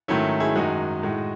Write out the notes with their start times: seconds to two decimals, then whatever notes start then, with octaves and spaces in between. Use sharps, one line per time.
0.08 G#2 D#3 F#3 A3 C#4 E4
0.40 E4 G#4
0.56 F#2 D#3 G#3 D#4 F#4
1.03 A2 G#3